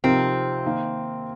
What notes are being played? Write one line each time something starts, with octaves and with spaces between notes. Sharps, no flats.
C3 F3 C4 D#4 A#4
D#3 A#3 D#4